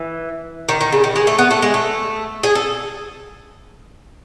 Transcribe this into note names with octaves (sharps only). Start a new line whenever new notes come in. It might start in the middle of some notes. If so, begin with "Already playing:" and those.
Already playing: E3
D#3
D#3
C#3
D#3
G#3
A3
B3
A3
G#3
A3
G#4
A4